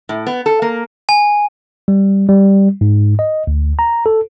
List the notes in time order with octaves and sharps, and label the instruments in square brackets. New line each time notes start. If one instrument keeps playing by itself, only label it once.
[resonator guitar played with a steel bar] A2
B3
A4
A#3
[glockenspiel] G#5
[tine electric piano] G3
G3
G#2
D#5
D2
A#5
A4